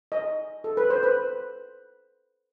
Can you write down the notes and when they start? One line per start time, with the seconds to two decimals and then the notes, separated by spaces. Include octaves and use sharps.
0.12 D#5
0.64 A4
0.77 B4
0.90 C5
1.03 B4